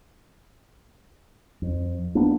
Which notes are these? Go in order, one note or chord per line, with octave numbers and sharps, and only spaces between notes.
F2
A#3 B3 D4